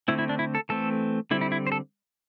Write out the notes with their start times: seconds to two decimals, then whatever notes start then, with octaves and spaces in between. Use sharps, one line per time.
0.08 D3 A3 C4 E4
0.19 E4
0.29 D4
0.39 E4
0.55 A4
0.69 E3 A3 C4 A4
1.31 D3 G3 C4 E4
1.41 E4
1.52 E4
1.67 C5
1.72 A4